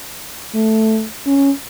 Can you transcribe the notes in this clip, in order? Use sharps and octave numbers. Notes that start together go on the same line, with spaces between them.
A3
C#4